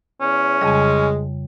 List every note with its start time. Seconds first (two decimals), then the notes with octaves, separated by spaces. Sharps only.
0.21 E2 C#4
0.61 F2 C#3 G3 G#3